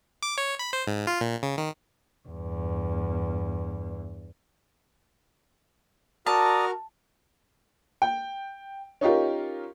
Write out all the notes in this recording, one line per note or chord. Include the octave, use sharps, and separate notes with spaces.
D6
C#5
B5
C5
G#2
F4
A#2
C#3
D#3
E2 G2
F#4 A#4 D5 A5 A#5 D#6 F6
G5
C#4 D#4 F4 G4 A#4